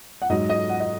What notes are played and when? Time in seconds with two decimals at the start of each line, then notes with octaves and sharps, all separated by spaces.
0.22 F#5
0.29 G#2 F#3 D#5
0.50 D#5
0.70 F#5
0.80 D#5